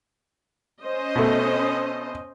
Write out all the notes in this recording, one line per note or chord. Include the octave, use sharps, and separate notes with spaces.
C#4 C5 D#5
B2 A3